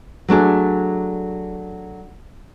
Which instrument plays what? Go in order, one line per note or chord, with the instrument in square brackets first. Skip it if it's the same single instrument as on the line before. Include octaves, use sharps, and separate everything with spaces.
[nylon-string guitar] F#3 A3 D4 G#4